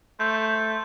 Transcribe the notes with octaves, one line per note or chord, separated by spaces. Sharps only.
A3 C5 G6